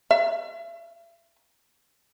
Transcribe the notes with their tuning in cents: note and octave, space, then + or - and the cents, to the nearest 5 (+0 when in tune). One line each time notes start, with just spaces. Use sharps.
E5 +40